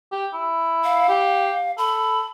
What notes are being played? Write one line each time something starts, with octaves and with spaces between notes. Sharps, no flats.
G4
E4
F5
G4
A4 B5